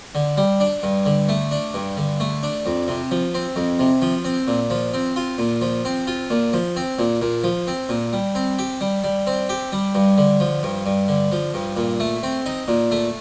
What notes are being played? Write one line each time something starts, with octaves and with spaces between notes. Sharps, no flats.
D3
G3
D4
G2
D3
A3
D4
G2
D3
A3
D4
F2
C3
F3
C4
F2
C3
F3
C4
A#2
F3
C4
F4
A#2
F3
C4
F4
A#2
F3
C4
A#2
A#2
F3
C4
A#2
G3
C4
G4
G3
G3
C4
G4
G3
G2
D3
F3
G2
G2
D3
F3
G2
A#2
A3
C4
D#4
A#2
A3